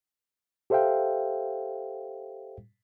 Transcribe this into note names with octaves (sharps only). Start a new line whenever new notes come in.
G4 A4 C5 E5 F5 G5